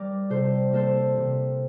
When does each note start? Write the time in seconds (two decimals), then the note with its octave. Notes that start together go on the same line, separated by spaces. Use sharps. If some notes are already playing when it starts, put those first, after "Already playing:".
Already playing: G3 A#4 D5
0.30 C3 A4 C5
0.73 A#3 A4 C5
1.18 C3